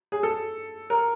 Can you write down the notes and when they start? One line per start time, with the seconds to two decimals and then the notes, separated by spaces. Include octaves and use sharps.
0.12 G#4
0.23 A4
0.90 A#4